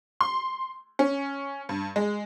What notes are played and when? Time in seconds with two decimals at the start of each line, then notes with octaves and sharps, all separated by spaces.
0.21 C6
0.99 C#4
1.69 G2
1.96 G#3